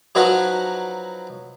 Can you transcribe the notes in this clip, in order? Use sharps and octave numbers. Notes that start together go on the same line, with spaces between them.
F3 F#3 D#4 F#4 B4